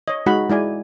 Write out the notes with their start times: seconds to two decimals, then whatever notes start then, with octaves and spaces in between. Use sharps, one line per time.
0.08 C#5 D#5
0.26 G#3 D#4 F#4 F#5 B5
0.50 G#3 E4 D5 G#5